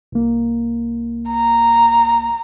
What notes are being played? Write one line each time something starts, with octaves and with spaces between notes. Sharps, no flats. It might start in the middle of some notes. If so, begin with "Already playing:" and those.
C2 A#3
A#5